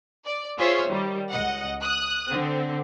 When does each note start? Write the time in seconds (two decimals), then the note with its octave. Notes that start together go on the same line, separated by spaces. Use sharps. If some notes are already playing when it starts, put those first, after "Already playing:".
0.26 D5
0.58 F4 G#4 C5 C#5 E5
0.89 D#3 G3
1.31 C#2 D#5 F#5
1.82 D#6 F#6
2.30 D3 C4